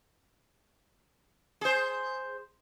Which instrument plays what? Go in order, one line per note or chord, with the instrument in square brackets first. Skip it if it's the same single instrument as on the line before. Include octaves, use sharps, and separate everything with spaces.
[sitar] G#4 C5